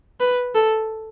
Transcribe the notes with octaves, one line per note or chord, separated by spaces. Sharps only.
B4
A4